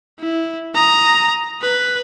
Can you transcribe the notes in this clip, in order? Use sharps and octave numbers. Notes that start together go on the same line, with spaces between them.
E4
A#5 D#6
B4